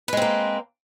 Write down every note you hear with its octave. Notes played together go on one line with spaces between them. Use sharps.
G#3 A#3 C4 B4